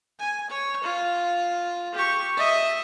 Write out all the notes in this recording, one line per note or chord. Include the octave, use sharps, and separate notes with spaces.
G#5
C#5
F4
G4 C#6
D#5 E5